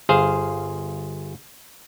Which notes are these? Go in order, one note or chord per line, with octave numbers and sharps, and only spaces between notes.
G1 G#4 C5 F5